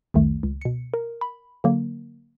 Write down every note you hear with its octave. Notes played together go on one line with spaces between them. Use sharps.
C2 F2 D#3 A3
C#2
B2 C#7
A#4
B5
D3 F#3 A#3